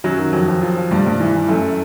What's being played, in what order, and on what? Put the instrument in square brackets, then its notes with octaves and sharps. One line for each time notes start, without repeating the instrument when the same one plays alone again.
[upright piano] F#2 F#3
D#3
F2 F#3
F2
F3
F3
G2 G3
G2
E3
E3
F#2 A3